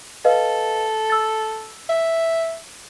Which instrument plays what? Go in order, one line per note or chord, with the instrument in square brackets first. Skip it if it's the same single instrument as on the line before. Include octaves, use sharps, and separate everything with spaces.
[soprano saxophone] A4 [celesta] B4 D#5 F5
[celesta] E6 A6
[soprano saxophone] E5